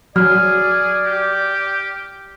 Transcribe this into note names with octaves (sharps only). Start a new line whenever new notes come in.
F#3 G#4 D5 F6
G4